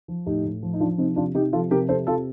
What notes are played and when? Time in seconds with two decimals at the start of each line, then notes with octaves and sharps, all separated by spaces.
0.08 F3
0.26 A2 D#4 G4
0.45 A2
0.63 F3
0.73 D#4
0.80 F3 D4 F4
0.98 C3 C4 D#4
1.16 C3 D4 F4
1.35 C3 D#4 G4
1.53 F3 F4 A4
1.71 C3 G4 A#4
1.89 C3 A4 C5
2.07 C3 F4 A4